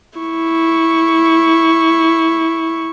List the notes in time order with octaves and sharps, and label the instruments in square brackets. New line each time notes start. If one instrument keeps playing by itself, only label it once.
[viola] E4 C#6